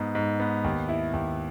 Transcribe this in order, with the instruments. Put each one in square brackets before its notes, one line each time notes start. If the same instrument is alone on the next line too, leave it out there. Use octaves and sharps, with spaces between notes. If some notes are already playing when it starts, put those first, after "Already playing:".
Already playing: [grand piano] G#2 B3
G#2
B3
D#2
E4
D#2